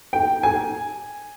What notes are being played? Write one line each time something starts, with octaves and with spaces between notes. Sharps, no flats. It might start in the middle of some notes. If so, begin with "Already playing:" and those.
G5
G#5